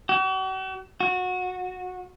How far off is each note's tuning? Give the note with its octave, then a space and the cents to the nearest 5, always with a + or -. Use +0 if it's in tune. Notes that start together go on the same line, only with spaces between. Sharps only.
F#4 +45
F#4 -20